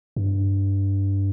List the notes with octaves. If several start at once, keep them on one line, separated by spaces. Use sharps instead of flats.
G2